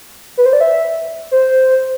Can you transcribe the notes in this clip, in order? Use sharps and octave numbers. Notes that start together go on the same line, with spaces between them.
B4
C5
D5
E5
C5